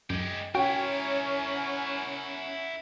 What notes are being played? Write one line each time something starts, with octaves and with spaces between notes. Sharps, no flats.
F#2 G#3 G4
C#4 E4 F#4 A#4 C#5 G5
F#5